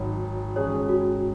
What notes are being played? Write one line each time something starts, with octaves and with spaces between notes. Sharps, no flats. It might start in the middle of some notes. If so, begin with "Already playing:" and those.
Already playing: G#1 G#2 F#3 D#4 C#5
G#1 G#2 G#3 C#4 G#4 C#5
F#4